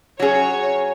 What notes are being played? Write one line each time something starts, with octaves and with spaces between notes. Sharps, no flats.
F#3 C#4 G#4 C#5